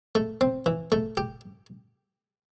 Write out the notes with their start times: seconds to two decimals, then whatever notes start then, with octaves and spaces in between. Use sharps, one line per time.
0.15 A3
0.41 C4
0.66 E3
0.92 A3
1.17 G4